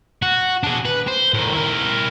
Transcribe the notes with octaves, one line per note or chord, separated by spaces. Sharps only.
F#4
D4 G#4
B4
C5
A2 D#3
E4 A#4